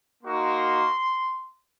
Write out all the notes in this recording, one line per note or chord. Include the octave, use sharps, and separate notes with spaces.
A#3 D#4 F#4 C6